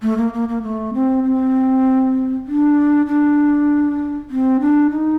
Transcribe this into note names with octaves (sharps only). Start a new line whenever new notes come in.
A3
A#3
A#3
A#3
A3
C4
C4
D4
D4
C4
D4
D#4